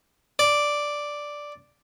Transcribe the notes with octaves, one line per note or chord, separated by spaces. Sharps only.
D5